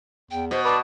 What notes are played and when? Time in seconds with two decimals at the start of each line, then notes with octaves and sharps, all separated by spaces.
0.31 E2 G5
0.51 B2 C5
0.65 B4 D5 A5